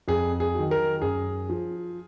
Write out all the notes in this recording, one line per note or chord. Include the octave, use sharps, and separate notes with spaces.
F2 G#4
G#4
D#3 F#3
A#4
F#2 G#4
F3